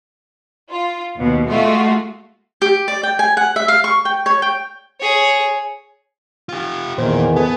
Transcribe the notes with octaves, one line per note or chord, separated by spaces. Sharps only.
F4
D#2 B2
G#3 A3 F4 F#4
G4
D5
G5
G#5
F#5
E5
F5
C#6
G5
C#5
G5
G#4 C#5
F4 G4
E2 A#2 D#3 E3 C5
B3 A4 G#5